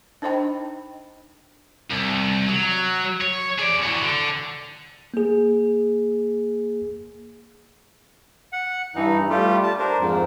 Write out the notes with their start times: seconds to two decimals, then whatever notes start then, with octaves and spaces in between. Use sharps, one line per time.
0.22 D4 D#4 C5 D#5 G5 B5
1.90 C2
2.48 F#3
3.21 C#5
3.58 G#4 D5
3.82 E3 F#4
4.01 D3
5.14 A#3 G#4
8.53 F#5
8.95 G2 E3 D#4
9.30 G3 A3 F4 G4
9.63 A5
9.79 D4 A#4 C5
9.99 F2 G#2